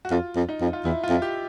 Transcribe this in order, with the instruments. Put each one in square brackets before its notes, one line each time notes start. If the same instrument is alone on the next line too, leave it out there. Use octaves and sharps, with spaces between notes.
[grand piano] F#4
[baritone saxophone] F2 [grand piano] F4
[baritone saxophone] F2
[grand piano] D#4
[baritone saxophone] F2
[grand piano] F4
[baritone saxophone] E2 [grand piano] E4
[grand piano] F4
[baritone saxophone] F2
[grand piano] G4